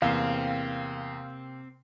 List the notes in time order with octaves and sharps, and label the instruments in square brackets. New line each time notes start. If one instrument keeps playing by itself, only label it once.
[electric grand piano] E2 [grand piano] C3 A#3 C7 [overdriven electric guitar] C4 [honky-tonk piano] F5